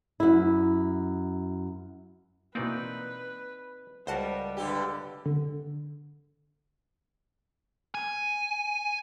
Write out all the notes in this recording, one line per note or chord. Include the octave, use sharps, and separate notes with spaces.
F#2 E4
B2 E3 A#3 C4 D#4 B4 D5
C#2 G3 F#4 A#4 C5 F#5 A5
G2 D3 G4
D3
G#5